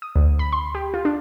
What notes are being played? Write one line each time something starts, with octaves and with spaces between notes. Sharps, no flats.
D#6
D2
B5
C6
G4
F4
D4